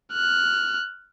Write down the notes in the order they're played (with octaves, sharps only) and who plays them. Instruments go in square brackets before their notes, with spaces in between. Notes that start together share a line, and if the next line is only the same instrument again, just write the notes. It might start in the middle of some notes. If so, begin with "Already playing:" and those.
[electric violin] F6 F#6